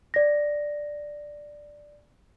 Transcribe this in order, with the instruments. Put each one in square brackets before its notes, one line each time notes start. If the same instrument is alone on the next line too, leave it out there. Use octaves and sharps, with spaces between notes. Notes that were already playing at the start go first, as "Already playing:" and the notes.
[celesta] D5 A#6